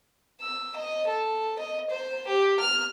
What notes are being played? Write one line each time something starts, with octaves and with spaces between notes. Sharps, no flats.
E6
D#5
A4
D#5
C5
G4
F6